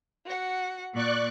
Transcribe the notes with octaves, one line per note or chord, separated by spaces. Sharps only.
F#4 F#5
A#2 D5 C#6 F#6